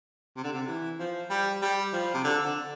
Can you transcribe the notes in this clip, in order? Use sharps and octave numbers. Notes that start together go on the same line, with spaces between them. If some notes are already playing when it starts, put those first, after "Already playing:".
C3
D3
C3
E3
F3
G3
G3
F3
C3
D3
D3